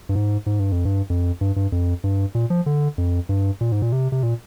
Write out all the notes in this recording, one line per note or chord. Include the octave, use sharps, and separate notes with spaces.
G2
G#2
G#2
G2
F2
G2
F2
G2
G2
F2
G2
A#2
F3
D3
F2
G2
A#2
G#2
A#2
C3
C3
A#2